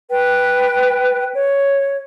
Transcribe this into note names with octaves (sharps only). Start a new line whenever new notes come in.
B4 G5
C#5